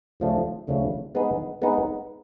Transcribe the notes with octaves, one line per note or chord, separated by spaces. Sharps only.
D2 C#3 F3 A3 D4
D2 C#3 F3 A3 D4
G#3 B3 D#4 G#4 B4
G#3 B3 D#4 G#4 B4